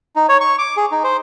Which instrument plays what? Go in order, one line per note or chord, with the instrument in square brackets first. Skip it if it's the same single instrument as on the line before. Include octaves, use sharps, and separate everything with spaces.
[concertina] D#4
C#5
C#6
D6
G#4
D#4
C5